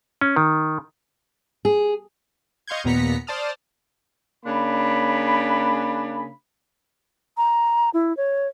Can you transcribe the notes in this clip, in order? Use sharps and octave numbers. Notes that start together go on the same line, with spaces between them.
C#4
D#3
G#4
D#5 F5 C6 C#6 G6 G#6
D#2 A#2 B3 A#5 B6 C#7
C5 D5 A5 D#6 F6
C#3 A#3 D4 B5
A#5
E4
C#5